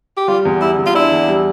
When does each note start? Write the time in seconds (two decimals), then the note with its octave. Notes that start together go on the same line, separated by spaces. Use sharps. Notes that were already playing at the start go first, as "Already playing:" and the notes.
0.17 G4
0.28 G3 F4
0.45 E2
0.61 G3 E4
0.78 E2
0.86 F4
0.95 D4 E4
1.12 E2
1.28 G3